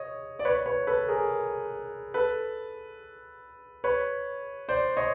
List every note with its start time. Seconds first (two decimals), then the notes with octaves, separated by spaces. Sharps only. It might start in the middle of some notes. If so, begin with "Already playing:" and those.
Already playing: C#5 D#5
0.39 D5
0.45 B4 C#5
0.66 B4 C#5
0.87 A4 B4
1.08 G#4 A#4
2.14 A4 B4
3.84 B4 C#5
4.69 C5 D5
4.97 C#5 D#5